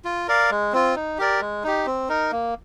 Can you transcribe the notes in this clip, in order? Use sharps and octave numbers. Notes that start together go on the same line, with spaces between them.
F4
A#4 D5 F5
G#3
C4 F4
D#4
G4 A#4 D5
G#3
D#4 G4
C4
D#4 A#4
A#3